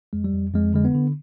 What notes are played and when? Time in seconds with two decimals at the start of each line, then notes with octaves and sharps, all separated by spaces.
0.13 F2 G#3
0.24 G3
0.34 F2
0.54 F2 G#3
0.74 D3 G#3
0.85 B3
0.95 D3